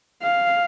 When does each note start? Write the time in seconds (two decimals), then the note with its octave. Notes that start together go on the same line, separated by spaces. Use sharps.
0.22 F5